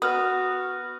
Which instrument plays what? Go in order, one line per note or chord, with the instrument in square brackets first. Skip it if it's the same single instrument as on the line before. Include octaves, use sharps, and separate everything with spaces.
[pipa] B3 [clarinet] F#4 [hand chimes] D#6 F6